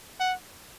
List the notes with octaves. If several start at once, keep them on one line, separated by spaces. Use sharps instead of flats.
F#5